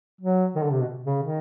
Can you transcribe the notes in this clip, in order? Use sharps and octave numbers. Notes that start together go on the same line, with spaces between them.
F#3
D#3
D3
C3
B2
C#3
D#3